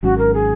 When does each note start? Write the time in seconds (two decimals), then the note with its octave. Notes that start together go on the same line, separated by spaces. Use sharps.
0.03 G#1 G#2 F#3 C#4 F#4
0.18 A#4
0.34 G#4